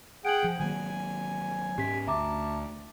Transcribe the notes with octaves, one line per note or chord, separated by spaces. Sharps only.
G#4 F#5 G5 D7 F#7
F3
D#3 F#3 A#3 G#5
G#2 C#4 G4 B6
D2 E5 A5 A#5 D6